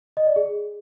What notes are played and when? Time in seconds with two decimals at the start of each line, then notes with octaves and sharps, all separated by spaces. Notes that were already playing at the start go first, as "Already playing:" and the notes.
0.17 D#5
0.27 D5
0.36 G#4